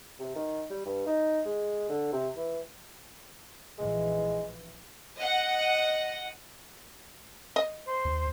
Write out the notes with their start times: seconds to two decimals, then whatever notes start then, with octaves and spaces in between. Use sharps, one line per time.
0.19 C3
0.36 D#3
0.70 G3
0.86 G2
1.06 D#4
1.45 G#3
1.89 D3
2.12 C3
2.36 E3
3.78 A#1 E3 G#3
5.18 D#5 F#5
7.56 D#5
7.86 C5
8.05 D#2